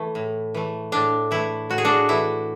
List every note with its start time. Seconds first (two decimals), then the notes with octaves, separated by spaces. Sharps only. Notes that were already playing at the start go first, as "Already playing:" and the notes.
Already playing: E3 A3
0.15 A2
0.54 E3 A3
0.92 A2 D4
1.31 E3 A3 E4
1.70 A2 F#4
1.78 G#4
1.85 D4 F#4
2.09 E3 A3 E4